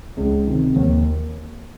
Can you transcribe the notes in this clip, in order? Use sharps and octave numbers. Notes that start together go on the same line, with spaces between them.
C#2
C3 D#3
D#2